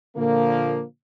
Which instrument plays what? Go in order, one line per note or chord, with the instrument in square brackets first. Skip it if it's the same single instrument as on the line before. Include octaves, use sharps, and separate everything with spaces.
[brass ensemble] A#2 D3 F3 A#3